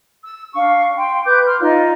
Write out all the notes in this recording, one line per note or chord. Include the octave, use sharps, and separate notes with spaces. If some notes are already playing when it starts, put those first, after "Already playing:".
E6
D4 F5 C#6
G5 C6
B4 D6 G6
C6 F6
D#4 F4 D5